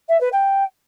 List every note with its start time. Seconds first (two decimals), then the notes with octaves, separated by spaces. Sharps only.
0.09 E5
0.21 B4
0.32 G5